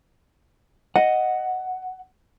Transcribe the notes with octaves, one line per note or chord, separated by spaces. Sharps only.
D#5 F#5